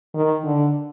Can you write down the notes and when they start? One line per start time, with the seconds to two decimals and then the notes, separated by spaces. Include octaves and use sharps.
0.14 D#3
0.44 D3